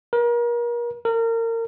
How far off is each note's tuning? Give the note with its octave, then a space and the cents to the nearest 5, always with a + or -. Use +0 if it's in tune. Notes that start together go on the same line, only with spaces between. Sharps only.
A#4 +35
A#4 -30